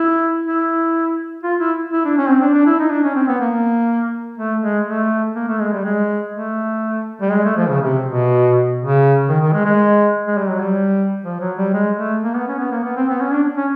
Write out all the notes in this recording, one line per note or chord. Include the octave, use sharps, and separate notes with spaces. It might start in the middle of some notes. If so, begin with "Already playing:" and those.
Already playing: E4
E4
F4
E4
E4
D4
C#4
C4
D4
D4
E4
D#4
D4
C#4
C4
B3
A#3
A3
G#3
A3
A#3
A3
G#3
G3
G#3
A3
G3
G#3
A3
F3
C#3
C3
B2
C#3
D#3
D#3
G#3
G#3
G#3
G3
F#3
G3
F3
F#3
G3
G#3
A3
A#3
B3
C#4
B3
A#3
B3
C4
B3
C#4
D4
C#4